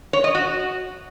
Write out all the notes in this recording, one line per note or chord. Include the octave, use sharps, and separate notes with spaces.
C#5
D#5
F#4